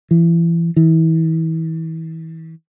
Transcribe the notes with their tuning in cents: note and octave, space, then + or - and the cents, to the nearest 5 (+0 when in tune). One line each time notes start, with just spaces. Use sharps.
E3 +30
E3 -35